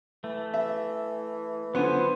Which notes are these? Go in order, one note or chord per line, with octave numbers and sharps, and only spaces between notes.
E3 A3
E3 E5
D3 F#3 B3 F4 B4 C5 G#5